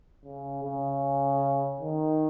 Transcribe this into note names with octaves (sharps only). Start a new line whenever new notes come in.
C#3
C#3
D#3